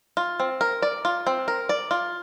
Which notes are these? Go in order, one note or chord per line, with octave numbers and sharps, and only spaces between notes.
F4
C4
A#4
D5
F4
C4
A#4
D5
F4